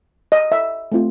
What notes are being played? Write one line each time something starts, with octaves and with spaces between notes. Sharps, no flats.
D#5
E5
A3 C4 F4